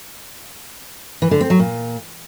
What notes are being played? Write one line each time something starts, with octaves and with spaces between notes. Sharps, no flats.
E3
D3
C4
F#3
A#2